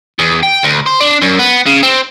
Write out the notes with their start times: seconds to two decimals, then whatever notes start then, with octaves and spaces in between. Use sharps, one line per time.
0.19 E2
0.43 G5
0.63 D2
0.86 C5
1.00 D4
1.21 F#2
1.39 B3
1.66 C#3
1.83 C4